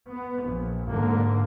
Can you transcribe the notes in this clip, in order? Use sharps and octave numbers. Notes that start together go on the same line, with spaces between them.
B3
A#1
G#2 D3 A#3